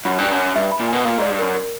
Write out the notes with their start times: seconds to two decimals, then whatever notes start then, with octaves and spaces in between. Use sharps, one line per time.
0.05 F#2 B5
0.18 G2 G#5
0.31 F#2
0.38 D6
0.56 G2 E5
0.72 B5
0.80 A#2
0.89 B2 G#5
1.05 A#2 F5
1.18 G#2 D5
1.30 G2
1.39 F#2 A#4
1.55 A#4